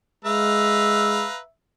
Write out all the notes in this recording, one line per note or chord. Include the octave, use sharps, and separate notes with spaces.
G#3 B4 E5 F5 A#5